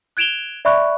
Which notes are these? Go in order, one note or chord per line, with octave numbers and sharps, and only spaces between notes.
F#6 G#6 D7 E7 F7 G7
D5 E5 B5 C#6 F#6